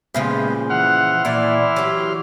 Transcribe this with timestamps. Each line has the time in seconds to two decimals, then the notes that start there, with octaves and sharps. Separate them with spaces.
0.14 A#2 C#3 F3 G#3 B3 G4
0.70 E3 F#5 C6 F6
1.25 A#2 E4 D5
1.76 F#3 G4